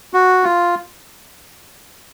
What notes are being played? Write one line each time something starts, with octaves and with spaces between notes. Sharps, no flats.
F#4
F4